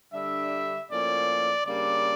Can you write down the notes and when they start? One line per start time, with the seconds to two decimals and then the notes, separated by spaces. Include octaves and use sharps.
0.13 D3 G3 D4 E5
0.91 A2 F3 A#3 C#4 D5
1.66 C#3 G3 A#3 D4 D5